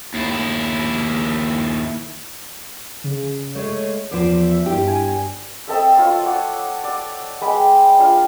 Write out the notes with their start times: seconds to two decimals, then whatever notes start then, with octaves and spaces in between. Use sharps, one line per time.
0.14 D#2 E4
3.04 C#3
3.55 G#3 A3 C#5
4.11 E2 F3 D6
4.42 E5
4.66 G2 E4 G4
4.87 G#5
5.68 C4 A4 D#5 E5
5.97 F4 C5 C#5
6.24 C#5 F#5 D6
6.84 D5 F#5
7.41 G#3 B4 G5 B5
7.99 D4 F4 F5